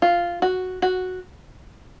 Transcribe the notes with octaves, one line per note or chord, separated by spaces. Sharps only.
F4
F#4
F#4